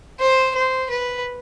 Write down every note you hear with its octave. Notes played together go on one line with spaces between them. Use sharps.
C5
C5
B4